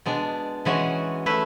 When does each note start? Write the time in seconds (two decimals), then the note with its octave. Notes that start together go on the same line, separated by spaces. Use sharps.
0.06 B2 G#3 D4
0.65 E3 G#3 C#4 F#4
1.26 A3 E4 B4